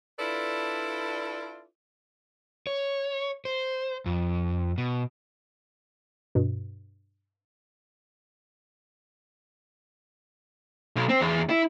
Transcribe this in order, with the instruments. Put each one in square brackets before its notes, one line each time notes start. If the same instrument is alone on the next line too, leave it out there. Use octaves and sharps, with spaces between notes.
[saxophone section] D4 E4 F4 A4 B4 D5
[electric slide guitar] C#5
C5
F2
B2
[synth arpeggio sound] G2 B2
[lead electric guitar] B1
C4
E2
E4